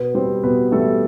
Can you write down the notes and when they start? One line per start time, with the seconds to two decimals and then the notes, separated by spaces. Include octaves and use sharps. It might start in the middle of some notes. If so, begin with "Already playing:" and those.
Already playing: B2 B3 B4
0.14 G3 C4 C5
0.43 B2 B3 B4
0.72 G3 A3 A4